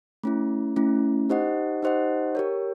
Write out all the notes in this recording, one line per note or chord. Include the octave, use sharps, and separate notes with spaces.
A3 C#4 E4
A3 C#4 E4
D#4 G4 C5 D#5 F#5
D#4 G4 C5 D#5 F#5
G4 A#4 C#5